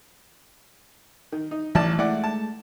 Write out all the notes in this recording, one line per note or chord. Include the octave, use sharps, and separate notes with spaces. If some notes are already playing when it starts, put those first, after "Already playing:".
D#3
D#4
A1 E3 D5 A5
G#3 A3 E4 D5 F#5
A5